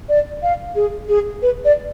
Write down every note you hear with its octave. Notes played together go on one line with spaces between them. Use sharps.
D5
F5
G#4
G#4
B4
D5